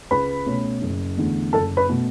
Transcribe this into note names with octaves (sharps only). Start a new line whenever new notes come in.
C#2 B4 B5
B2 A3 C#4
F#1
E2 D3 A3
F#1 A4 A5
B4 B5
B2 A3